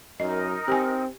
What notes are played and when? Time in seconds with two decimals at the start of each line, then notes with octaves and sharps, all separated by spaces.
0.20 F#2 D#4 A#4 D#5
0.68 C4 G4 G#5